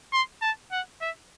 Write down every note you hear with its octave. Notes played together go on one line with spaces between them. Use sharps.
C6
A5
F#5
E5